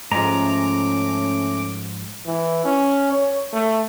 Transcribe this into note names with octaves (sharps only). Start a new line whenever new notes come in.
G#2 F3 A3 C#4 A#5 D6
E3
C#4
C#5
A3